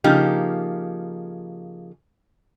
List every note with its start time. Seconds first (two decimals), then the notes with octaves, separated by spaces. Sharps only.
0.04 C#3 F3 A#3 D#4 G4